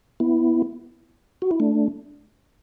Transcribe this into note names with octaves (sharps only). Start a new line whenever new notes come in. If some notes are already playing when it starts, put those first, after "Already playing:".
B3 E4
F#4
E4
A3 D4